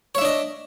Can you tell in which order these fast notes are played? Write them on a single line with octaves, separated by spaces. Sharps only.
C#5 E5 D4 D#5